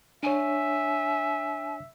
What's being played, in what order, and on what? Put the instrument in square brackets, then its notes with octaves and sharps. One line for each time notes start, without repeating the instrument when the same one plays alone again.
[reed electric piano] D4 C#5 [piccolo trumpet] E5 [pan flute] G#5